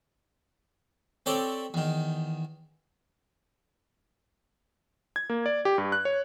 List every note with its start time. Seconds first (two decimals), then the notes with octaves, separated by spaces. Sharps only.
1.26 C4 G4 A4 C#5 D5
1.74 E2 D#3
5.16 G#6
5.30 A#3
5.46 D5
5.65 G4
5.78 G2
5.92 F#6
6.05 C#5